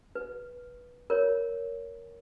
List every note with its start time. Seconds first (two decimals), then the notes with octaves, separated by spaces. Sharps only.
0.15 B4
1.10 A#4 C#5